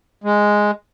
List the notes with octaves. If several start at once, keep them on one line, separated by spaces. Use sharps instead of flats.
G#3